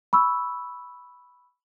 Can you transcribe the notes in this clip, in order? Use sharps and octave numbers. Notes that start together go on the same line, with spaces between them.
B5 C#6 E6